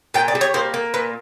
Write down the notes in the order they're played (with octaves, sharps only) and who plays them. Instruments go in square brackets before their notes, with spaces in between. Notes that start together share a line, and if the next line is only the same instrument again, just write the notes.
[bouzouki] A#2 G5
D5
G3
C#5
A#3 C5
A#3
A#2 B4